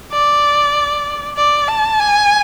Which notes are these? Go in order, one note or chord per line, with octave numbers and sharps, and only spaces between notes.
D5
D5
A5
G#5